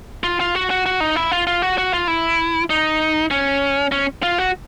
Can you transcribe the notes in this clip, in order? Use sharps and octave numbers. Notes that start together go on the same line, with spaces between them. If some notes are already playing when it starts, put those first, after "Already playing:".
F4
F4
F#4
F#4
F#4
D#4
E4
F4
F4
F#4
F#4
F4
E4
D#4
C#4
C#4
F4
F#4